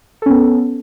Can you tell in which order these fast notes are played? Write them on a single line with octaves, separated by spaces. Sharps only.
A4 C#4 B3